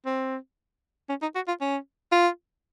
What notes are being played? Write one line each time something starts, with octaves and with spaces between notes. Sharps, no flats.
C4
C#4
D#4
F#4
F4
C#4
F4